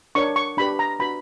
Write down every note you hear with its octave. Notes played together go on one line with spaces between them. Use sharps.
D4 A#4 C#5 C#6
C#6
D4 G4 B4 B5
A#5
D4 F#4 B4 B5